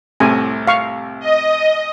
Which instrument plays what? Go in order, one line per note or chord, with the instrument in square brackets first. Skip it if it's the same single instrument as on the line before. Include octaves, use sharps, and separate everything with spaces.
[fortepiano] C2 A2 C3 [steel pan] G#5
[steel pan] F5 C#6
[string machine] D#5